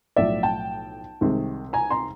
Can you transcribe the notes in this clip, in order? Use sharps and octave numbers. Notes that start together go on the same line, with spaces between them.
B1 A2 F3 D5 E5
G5 A5
C2 C3 D#3 G#3
G#5 A#5
A#5 C6